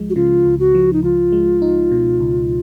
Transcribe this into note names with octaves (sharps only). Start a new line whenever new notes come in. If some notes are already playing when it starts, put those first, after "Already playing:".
Already playing: C#2 F3 G#3
F#4
C#3 F4
C#2
F#4
F3
D#4
C#2 F4
G#3
D#4
B2
C#2